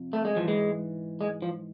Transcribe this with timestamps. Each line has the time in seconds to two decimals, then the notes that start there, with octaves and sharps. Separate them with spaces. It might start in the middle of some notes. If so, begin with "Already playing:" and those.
Already playing: F2 C3
0.13 A3
0.25 G#3
0.35 G#2 E3 F3
0.48 G#3
1.21 G#3
1.42 F3